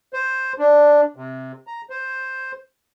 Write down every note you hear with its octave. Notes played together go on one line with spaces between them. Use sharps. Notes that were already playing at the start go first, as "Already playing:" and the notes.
C5
D4
C3
A#5
C5